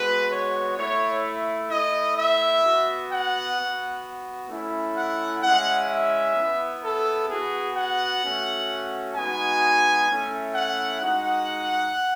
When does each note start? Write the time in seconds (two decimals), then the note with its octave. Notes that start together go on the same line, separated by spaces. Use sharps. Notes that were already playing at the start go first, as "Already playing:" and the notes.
Already playing: G#3 B3 F#4 B4
0.31 C#5
0.77 A3 E4 C#5
1.70 A3 E4 D#5
2.17 E5
2.64 B3 F#4
3.10 F#5
3.57 B3 F#4
4.49 A3 C#4 E4
4.96 F#5
5.43 G#3 C#4 E4 F#5
5.89 E5
6.36 B3 E4
6.83 A4
7.28 B3 F#4 G#4
7.76 F#5
8.22 A3 C#4 F#4
9.14 G#3 B3 D#4 F#4 G#5
10.08 A3 C#4 E4
10.54 F#5
11.01 G#3 D#4 F#4 F#5